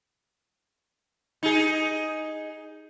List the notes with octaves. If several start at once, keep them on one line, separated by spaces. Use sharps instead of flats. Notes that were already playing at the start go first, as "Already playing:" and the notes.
D#4 G#4